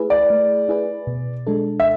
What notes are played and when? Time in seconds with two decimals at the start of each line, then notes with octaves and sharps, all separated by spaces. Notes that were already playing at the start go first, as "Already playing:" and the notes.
Already playing: A3 E4 G#4 B4
0.10 D5
0.30 A3
0.69 E4 G#4 B4
1.07 B2
1.47 G#3 D4 A4
1.80 E5